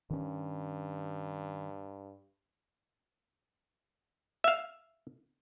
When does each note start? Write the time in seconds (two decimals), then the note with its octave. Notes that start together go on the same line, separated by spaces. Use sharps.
0.10 G2 D#3 C#4
4.44 E5 F5